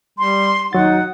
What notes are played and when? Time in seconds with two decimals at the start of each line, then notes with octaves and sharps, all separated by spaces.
0.19 G3 C6
0.73 D#2 F#3 D#4 F#5 A6